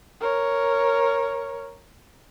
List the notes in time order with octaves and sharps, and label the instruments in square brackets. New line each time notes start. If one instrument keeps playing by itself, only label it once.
[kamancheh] A#4 C#5